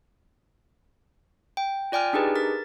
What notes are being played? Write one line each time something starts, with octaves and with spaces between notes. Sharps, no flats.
G5
F4 D5 G5 G#5 F6
D4 D#4 G4 G#4 B4
A#4 A6